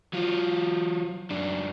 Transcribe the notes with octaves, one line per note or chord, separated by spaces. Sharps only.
F#3 F4
F#2 D4